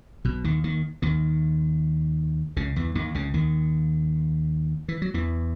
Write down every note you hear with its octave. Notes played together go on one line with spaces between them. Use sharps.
B1 B2
D#2 D#3
D#2 D#3
D#2 D#3
C#2 C#3
E2 E3
D#2 D#3
C#2 C#3
D#2 D#3
E3
F#3
E2 E3